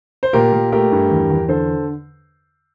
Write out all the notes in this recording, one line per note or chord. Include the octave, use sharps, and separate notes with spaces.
C5
A#2 G4 A#4
A#2
A3 G4 A#4
G2
E2
E2
D3 A4 C5